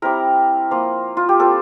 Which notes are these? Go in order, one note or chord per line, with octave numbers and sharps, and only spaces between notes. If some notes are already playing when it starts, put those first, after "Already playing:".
G3 C4 E4 A#4
F3 A#3 F4
F4
G4
G3 C4 F4 A4